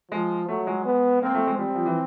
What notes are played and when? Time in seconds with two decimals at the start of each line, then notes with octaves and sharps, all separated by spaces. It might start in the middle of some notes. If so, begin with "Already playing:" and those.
0.11 F3 G#3
0.48 F#3 A3
0.67 G#3
0.85 B3
1.22 A#3 C4
1.35 A3
1.47 G#3
1.58 G3 C4
1.74 F3
1.86 E3